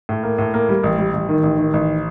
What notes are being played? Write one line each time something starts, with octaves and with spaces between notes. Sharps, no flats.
A2
A#3
A2
A#3
G3
A1
G3
A1
D#3
A1
D#3
A1